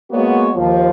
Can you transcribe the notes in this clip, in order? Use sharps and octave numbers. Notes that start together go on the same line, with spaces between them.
G#3 A#3 B3 F#4 C#5
D#2 F3